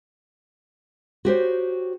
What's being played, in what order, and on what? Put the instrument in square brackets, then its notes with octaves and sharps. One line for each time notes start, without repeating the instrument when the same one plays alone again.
[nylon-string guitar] F#4 G4 C5 C#5